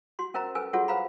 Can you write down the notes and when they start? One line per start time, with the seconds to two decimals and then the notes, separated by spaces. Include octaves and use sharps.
0.19 F#4 C6
0.34 C#4 A#4 C5 E5 A#5
0.55 C#4 A4 B4 G#5 E6
0.73 F4 F#4 G#4 A4 C#5 F#5
0.88 B4 C5 F5 A#5 B5